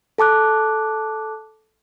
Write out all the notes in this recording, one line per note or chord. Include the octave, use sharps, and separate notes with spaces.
A4 A5 D6 F#6